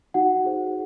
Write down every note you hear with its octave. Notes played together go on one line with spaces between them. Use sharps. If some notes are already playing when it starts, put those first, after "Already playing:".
D#4 F#4 F#5
G#4 C5